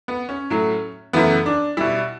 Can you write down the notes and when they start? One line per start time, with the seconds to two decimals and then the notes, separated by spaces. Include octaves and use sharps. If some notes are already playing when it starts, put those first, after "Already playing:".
0.08 B3
0.29 C#4
0.50 A2 F#3 A3
1.13 F#2 C#3 E3 A3 B3
1.46 D4
1.77 B2 G3 E4